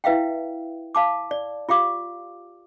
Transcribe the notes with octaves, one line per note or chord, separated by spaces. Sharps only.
E4 B4 E5 F5 G5
F5 A5 D6
D5
F4 G4 F5 D6